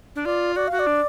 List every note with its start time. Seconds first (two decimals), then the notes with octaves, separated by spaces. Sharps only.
0.16 D4
0.25 F4 D5
0.56 F#4 D5
0.68 F#4 F5
0.79 D5
0.87 D4